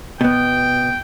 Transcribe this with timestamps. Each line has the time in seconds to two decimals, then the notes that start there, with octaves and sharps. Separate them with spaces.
0.21 B2 B3 G5